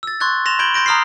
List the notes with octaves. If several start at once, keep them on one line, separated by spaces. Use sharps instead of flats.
E6 A6
C6 C#6 F#6 G#6 A6
C6 A#6 E7 F7
B5 G6 G#6 D7 F#7 G7
C6 G6 A#6 D7
A#5 D#6 F6 A#6 C7